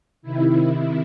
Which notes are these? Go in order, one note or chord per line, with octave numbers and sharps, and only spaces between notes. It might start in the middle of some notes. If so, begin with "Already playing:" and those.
C3 D#3 E4